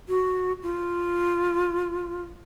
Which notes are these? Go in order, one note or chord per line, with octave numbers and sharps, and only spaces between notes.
F#4
F4